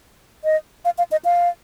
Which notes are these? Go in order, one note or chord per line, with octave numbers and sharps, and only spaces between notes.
D#5
F5
F5
D#5
F5